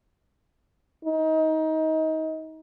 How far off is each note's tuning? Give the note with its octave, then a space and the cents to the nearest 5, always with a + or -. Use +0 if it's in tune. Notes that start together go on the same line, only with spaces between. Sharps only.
D#4 +25